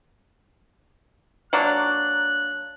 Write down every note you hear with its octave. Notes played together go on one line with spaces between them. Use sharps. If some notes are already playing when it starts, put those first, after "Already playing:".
F#3 A#3 D4 F#6